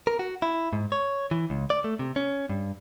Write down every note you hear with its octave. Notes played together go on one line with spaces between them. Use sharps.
A#4
F#4
E4
G#2
C#5
E3
C#2
D5
A3
C3
C#4
G2